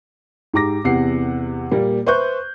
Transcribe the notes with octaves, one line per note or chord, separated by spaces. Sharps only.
G#2 G4 A#5 D6 A#6
E2 C3 F#5 C7
A#2 G3 A#3
B4 C5 E5 C#6 F#6 G6